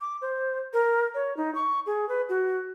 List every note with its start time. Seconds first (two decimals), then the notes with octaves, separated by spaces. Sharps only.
0.01 D6
0.22 C5
0.73 A#4
1.14 C#5
1.37 D#4
1.55 C#6
1.86 G#4
2.09 B4
2.29 F#4